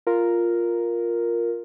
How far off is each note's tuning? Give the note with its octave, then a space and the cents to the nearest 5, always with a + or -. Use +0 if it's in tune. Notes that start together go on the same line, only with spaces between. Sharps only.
F4 +0 A#4 +0